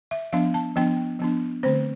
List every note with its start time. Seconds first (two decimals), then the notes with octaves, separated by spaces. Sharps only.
0.11 E5
0.33 F3 B3 D4 F5
0.54 A5
0.76 F3 B3 D4 G5
1.19 F3 B3 D4
1.63 D3 A3 C4 C5